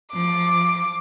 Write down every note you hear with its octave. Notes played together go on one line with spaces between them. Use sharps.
F3 D6